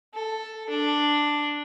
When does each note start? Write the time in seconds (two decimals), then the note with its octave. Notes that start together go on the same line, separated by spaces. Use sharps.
0.14 A4
0.69 D4